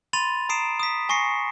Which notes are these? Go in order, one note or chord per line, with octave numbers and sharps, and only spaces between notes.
B5 C6 A6 D#7 F7
A#5 D#6 C7 D7 E7
D#6 B6
G#5 C#6 A#6 C7 C#7